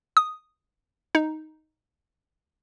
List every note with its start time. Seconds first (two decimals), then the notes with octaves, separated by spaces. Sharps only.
0.17 D#6
1.15 D#4